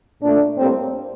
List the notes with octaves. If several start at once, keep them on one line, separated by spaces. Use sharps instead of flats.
A#2 A3 D4
A2 G3 A#3 C4